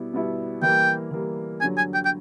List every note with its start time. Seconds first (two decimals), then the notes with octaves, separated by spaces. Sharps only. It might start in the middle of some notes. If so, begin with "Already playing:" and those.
Already playing: B2 G3 B3 E4
0.13 B2 G3 B3 E4
0.62 E3 G3 A#3 G5
1.11 E3 G3 A#3
1.61 G2 D3 F#3 G#5
1.77 G#5
1.94 G5
2.05 G5